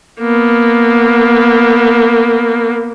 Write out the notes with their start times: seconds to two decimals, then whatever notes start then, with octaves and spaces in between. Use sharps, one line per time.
0.20 A#3 B3